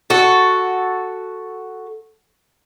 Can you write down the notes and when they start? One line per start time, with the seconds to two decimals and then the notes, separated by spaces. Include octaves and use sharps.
0.10 F#4 A4